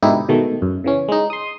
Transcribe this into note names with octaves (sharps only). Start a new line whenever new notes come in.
G#2 B2 D3 D#4 E4 G4
B2 D#3 G#3 A3
F#2
C#3 E3 C#4
G#3 D#4
C6 D#6